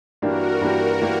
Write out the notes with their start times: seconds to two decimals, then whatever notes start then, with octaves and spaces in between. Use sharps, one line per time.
0.22 G2 E3 A#3 D4 F#4 G4 A#4
0.61 G2 E3 A#3 D4 G4
1.02 E3 A#3 D4 G4